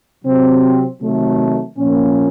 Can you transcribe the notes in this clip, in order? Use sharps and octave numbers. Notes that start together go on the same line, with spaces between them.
C3 F#3 C4
C3 D#3 F#3 A3
A#2 F3 A#3 C#4